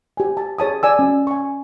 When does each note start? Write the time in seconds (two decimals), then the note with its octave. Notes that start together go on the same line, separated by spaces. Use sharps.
0.17 G4 G#5
0.37 A5
0.58 G#4 C#5 A5 D#6
0.83 D5 G#5 E6
0.99 C#4
1.27 G#5 C#6